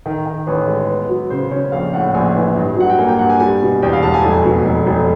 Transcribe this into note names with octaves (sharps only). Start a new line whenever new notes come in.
D#3
D#3
A1 B4
G#3
B3
F#3
C#3 C5
C#3 C#5
A#1 F5
A2 F#5
A#1 G#5
E3
G2
F#3 F#5
G5
A#3 G#5
G5
G2 F#5
G#5
G3 G#5
B2
E2 G5
F5
E1 A5
G#5
F1
B2
F1
F1